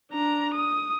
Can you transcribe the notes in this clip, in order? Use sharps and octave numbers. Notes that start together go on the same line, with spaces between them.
D4 A#5
D#6